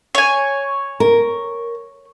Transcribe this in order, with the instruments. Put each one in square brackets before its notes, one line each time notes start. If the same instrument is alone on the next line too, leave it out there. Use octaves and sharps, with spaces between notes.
[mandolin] C#5 G#5
[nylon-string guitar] A#4